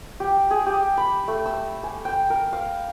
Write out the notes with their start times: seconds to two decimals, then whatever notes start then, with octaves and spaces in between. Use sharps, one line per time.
0.20 G4
0.51 G#4
0.66 G4
0.97 B5
1.28 A3
1.46 E6
1.83 G#5
2.05 G5
2.30 A#4
2.53 F5